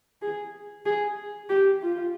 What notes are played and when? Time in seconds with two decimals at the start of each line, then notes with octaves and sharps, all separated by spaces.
0.22 G#4
0.86 G#4
1.50 G4
1.82 F4